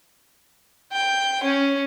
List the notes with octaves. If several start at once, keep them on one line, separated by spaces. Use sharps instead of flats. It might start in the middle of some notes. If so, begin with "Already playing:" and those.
G5
C#4